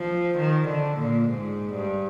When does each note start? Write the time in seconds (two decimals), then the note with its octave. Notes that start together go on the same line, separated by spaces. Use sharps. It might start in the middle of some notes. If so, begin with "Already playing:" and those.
Already playing: F3
0.38 D#3
0.68 D3
0.98 A#2
1.29 G#2
1.74 G2